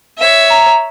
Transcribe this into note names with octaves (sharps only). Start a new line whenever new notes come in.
C#5 E5
A#5